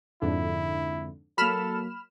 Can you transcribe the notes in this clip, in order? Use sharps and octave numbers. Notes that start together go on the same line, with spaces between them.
F2 G#2 D3 E4
F#3 A#3 A4 B5 F6 E7